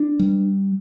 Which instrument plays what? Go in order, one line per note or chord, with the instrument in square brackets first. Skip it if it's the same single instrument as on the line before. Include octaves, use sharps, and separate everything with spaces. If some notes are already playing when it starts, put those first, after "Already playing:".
Already playing: [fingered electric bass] D4
G3